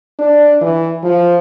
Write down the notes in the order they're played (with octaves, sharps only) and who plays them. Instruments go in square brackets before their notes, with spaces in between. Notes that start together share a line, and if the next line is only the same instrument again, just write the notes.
[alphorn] D4
E3
F3